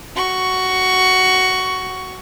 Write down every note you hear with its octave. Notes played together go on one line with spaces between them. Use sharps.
F#4 C#6